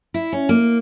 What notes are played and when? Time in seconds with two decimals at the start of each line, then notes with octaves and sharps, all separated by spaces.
0.14 E4
0.32 C#4
0.49 A#3